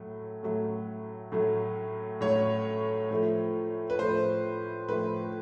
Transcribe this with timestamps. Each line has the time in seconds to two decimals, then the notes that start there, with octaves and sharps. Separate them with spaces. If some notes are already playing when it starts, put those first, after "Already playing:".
Already playing: A2 F#3 A3
0.43 A2 F#3 A3
1.32 A2 F#3 A3
2.21 A2 F#3 A3 C#5
3.11 A2 F3 A3
3.90 B4
3.99 A2 F3 A3 C5
4.88 A2 F3 A3 B4